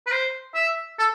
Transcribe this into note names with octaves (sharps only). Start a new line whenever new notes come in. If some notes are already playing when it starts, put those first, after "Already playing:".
B4
C5
E5
A4